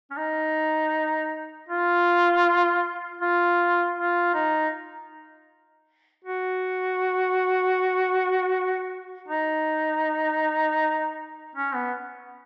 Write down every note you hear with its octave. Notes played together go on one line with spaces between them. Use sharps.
C#4
D#4
F4
F4
F4
D#4
F#4
D#4
C#4
B3